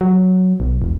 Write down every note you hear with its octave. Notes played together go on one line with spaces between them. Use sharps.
F#3
B1
E1